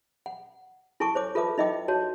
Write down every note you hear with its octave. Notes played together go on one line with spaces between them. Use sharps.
F#5
E4 A4 G#5 A5 C#6 D6
C5 C#5 D6
F4 A4 B4 E5 A5 D6
D#4 E4 D#5 E5 G5 D6
F#4 C#5 A5